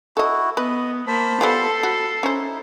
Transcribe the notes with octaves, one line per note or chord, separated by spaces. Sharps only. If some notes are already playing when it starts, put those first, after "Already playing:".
E4 F#4 A4 D#5
B3 B4 D#5
A#3 C5 A5 B5 B6
F3 G3 B3 A4 C7
F#4 B5
C#4 D#4 E4 C5